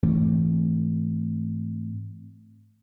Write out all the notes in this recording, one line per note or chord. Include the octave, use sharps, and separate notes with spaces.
G#2 E3 A3 C4